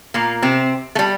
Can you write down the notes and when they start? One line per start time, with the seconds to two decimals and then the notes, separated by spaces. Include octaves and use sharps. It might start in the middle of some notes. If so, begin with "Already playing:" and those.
0.14 A#2 A#3
0.42 C3 C4
0.95 A3
0.99 G3